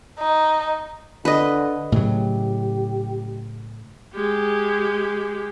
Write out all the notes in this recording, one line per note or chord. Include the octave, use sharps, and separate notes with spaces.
D#4
D3 B4 D#5
A2 C#3 F#3 G4
G#3 G4